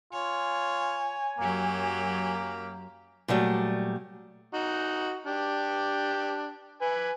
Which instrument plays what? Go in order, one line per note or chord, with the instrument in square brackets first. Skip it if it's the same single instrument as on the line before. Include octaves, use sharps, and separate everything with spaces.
[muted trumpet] F4 [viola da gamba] C#5 [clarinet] G#5
[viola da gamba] F#2 F#3 G4 [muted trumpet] A#3
[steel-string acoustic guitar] A#2 F#3 G3 A3
[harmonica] D#4 F#4
D4 G4
B4 G#5